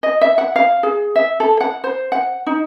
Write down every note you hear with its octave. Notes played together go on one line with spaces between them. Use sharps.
D#5
E5
F#5
F5
G#4
E5
A4
F#5
C5
F#5
D#4